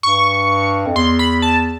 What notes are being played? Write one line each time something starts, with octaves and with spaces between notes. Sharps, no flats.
G2 C#6
F2
E2 C6
B5
A5